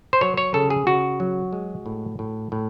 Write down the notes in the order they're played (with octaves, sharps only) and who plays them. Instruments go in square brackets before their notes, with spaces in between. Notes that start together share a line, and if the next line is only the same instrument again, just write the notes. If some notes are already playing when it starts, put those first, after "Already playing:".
[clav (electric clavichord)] C5
F#3 C#5
C#5
C#3 A4
G#4
C#3 F#4
F#3
G#3
A2
A2
A2